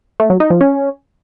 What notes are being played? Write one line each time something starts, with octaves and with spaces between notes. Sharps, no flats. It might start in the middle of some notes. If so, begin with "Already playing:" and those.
A3
F#3
D#4
F3
C#4